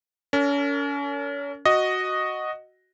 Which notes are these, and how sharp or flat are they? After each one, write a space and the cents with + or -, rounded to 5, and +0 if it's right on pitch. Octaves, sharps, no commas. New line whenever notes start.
C#4 +35 A#4 -30
F#4 +0 D#5 +0